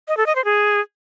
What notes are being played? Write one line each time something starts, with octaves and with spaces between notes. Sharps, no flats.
D#5
A4
D#5
C5
G#4